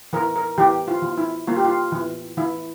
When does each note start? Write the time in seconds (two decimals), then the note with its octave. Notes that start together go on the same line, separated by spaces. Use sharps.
0.13 E3 A#4
0.36 A#4
0.58 E3 G4
0.88 F4
1.02 E3
1.18 E4
1.47 A#3 F4
1.57 G4
1.65 F4
1.92 E3
2.37 E3 E4